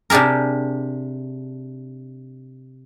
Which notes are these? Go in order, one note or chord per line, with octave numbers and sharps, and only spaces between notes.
C3 D4 G4 G#4 A#4